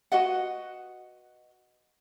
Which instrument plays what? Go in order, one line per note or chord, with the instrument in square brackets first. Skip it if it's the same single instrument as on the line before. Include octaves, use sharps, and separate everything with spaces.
[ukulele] F#4 B4 D#5 F#5